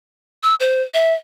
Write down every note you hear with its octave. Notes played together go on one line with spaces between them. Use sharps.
E6
C5
E5